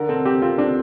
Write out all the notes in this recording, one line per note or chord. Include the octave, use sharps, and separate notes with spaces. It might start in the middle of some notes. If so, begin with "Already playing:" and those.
Already playing: D3 A#4
C4 A4
C4 G4
C4 F4
C4 D4